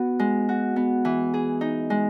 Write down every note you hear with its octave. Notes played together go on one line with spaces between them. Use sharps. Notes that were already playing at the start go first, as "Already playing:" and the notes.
Already playing: B3 F#4
G#3
F#4
B3
E3
G#4
D#4
G#3